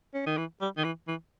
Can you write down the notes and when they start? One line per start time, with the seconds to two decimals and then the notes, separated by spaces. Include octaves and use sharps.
0.14 C#4
0.26 D#3
0.37 E3
0.61 G3
0.77 D#3
0.84 E3
1.08 E3